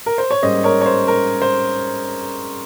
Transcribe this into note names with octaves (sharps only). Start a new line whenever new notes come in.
A#4
C5
C#5
G#2 G3 A#3 C#4 C5 D#5
A#4 C#5
C#5
C5
A#4
C5